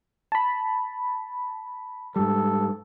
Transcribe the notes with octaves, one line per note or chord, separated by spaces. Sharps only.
A5 B5
G#2 G3 A4